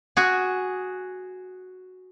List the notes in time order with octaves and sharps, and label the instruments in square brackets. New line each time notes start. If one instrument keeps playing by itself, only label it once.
[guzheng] F#4 G#4